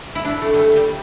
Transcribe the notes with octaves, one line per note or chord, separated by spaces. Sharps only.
E4
D4
A3
G3
A3
G3